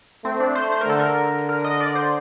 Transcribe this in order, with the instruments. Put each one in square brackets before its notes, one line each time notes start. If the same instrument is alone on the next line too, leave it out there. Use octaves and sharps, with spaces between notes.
[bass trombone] A3 [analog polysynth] C4
[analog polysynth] D4
C5
C5
A#4
[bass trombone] D3 [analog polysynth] A4
[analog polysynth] A#4
A#4
D#5
D5
C5